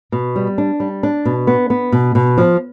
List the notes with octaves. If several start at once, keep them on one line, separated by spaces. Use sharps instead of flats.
B2
G3
D4
G3
D4
B2
B3
B3
B2
B2
F3